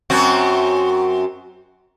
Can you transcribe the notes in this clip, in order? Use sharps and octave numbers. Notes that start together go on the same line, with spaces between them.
F#2 C4 F#4